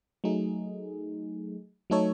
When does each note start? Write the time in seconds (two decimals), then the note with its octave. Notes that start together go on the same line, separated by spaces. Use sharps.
0.24 F#3 A3 D#4 G#4
1.90 F#3 A3 D#4 A4 C#5